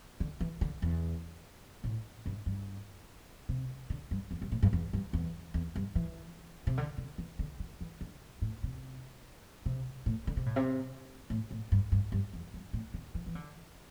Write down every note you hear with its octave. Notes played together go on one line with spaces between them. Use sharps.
D3
E3
D3
E2
A2
G2
G2
C3
D3
G2
E2
G2
A2
G2
E2
G2
E2
E2
G2
E3
C3
D3
D3
E3
D3
D3
E3
D3
A2
C3
C3
A2
D3
C3
A2
C3
A2
A2
G2
G2
G2
E2
G2
A2
D3
E3
E3
D3